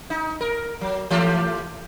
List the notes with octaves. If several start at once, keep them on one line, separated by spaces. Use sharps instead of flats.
D#4
A#4
F#3
E3 A3 G4